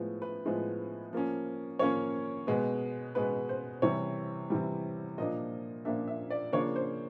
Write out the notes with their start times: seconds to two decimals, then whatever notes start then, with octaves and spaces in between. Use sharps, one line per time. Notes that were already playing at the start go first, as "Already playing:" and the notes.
Already playing: A2 F3 G#3 B3
0.22 B4
0.45 A2 F3 G#3 B3
1.13 F3 A#3 C#4
1.79 F3 A#3 C#4 C#5
2.47 B2 G#3 B3
3.15 B2 G#3 B3 B4
3.49 C5
3.82 C3 E3 G3 C#5
4.50 C3 E3 G3
5.18 A#2 F3 A#3 D4 D#5
5.85 A#2 F3 A#3 D4 E5
6.08 E5
6.30 D5
6.53 C#3 F3 A#3 D4 C#5
6.76 C5